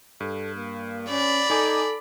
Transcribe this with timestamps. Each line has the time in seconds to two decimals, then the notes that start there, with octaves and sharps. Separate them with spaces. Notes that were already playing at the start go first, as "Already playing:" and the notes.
0.20 G2 A4
0.55 A#3
1.09 C#4 D5 B5
1.50 D#4 A4 G#5 D6